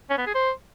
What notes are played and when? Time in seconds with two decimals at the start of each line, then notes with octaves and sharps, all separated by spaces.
0.10 C#4
0.18 B3
0.26 G#4
0.34 C5